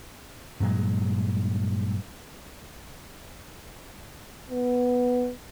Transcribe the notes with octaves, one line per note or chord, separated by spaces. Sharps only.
G2 A#2 F#3 G#3
B3